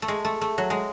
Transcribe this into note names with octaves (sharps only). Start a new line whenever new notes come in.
A3
G#3
A3
A3
F#3
G#3